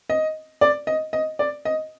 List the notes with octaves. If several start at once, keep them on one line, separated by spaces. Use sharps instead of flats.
D#5
D5
D#5
D#5
D5
D#5